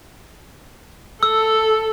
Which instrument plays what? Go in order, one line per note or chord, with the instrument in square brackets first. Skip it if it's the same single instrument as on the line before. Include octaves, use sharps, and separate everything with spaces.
[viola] A4 [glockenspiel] E6